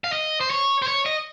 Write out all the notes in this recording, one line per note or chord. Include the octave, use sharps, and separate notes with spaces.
F5
D#5
C5
C#5
C5
C#5
D#5